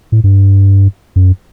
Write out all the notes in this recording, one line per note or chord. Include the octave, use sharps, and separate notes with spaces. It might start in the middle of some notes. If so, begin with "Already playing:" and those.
A2
G2
F#2